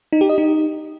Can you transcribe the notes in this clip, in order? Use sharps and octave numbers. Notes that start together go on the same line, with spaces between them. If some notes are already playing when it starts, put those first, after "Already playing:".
D#4
G4
D#5
D#4